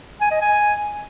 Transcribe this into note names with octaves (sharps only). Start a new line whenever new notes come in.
G#5
D#5
G#5